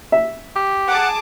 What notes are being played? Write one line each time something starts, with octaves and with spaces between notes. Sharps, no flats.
E5
G4
G#4 F#5 A5 D6